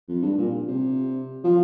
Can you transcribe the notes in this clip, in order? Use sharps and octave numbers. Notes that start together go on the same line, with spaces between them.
F2
G2
A#2
C3
F3